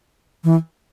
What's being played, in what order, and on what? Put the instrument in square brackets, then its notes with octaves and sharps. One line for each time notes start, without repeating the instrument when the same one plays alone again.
[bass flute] E3